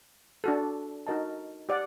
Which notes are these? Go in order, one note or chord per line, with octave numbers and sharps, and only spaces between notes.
D4 F#4 A4
D#4 F#4 A#4 D#5 A5
G4 D5 F#5